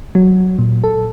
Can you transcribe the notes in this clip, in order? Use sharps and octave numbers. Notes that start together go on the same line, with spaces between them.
F#3
A#2
A4